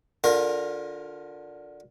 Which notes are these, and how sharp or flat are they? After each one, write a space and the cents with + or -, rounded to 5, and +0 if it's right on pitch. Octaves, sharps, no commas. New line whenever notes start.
D3 +0 F4 +30 A#4 +0